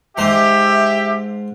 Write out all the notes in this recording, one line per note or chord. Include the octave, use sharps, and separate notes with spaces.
G#2 G4 C5 E5 A#5